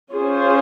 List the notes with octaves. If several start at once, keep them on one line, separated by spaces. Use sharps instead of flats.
C#4 F4 G#4 C5